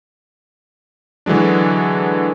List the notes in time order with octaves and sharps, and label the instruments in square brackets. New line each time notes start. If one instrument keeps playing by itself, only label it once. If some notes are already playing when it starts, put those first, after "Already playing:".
[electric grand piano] D3 E3 F#3 G#3 D4